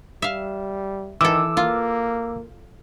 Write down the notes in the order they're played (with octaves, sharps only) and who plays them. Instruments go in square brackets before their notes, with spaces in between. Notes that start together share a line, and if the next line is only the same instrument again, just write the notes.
[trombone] G3 [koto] E5 F5
[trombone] D#3 [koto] E3 A4 [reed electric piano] D6 E6
[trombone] A#3 [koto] F4